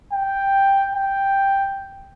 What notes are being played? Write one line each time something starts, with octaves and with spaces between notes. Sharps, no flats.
G5
G5